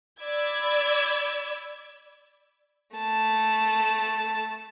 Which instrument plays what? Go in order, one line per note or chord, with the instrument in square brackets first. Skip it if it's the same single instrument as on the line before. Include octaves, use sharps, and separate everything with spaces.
[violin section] D5 B5 D6 E6 G#6
[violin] A3 A5